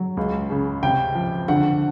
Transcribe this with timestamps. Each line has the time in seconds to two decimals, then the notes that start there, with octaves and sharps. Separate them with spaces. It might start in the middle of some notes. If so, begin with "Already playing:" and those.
Already playing: F#3
0.17 C#2
0.50 C#3
0.83 C3 G5
1.15 F3
1.48 D3 F#5